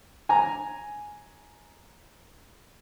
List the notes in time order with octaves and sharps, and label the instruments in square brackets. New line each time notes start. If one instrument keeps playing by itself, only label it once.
[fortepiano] G#5 A#5